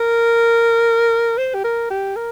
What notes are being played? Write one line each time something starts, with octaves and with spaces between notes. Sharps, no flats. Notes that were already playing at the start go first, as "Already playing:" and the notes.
Already playing: A#4
C5
G4
A#4
G4
A#4